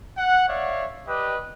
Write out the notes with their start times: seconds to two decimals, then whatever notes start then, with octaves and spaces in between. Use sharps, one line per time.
0.18 F#5
0.48 C#5 D5 E5 F5
1.07 G4 B4 D5 D#5